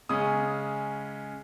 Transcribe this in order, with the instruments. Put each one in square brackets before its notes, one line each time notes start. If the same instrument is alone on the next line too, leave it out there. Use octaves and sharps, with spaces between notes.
[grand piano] C#3 G#3 C#4 D#6